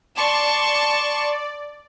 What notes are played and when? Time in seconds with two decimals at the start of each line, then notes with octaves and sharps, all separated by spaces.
0.17 D5 A5 C6 C#6